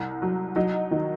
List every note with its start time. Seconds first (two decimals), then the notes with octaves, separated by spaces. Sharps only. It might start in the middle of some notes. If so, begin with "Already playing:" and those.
Already playing: C2
0.22 F#3
0.56 F#3 D#4
0.91 D#3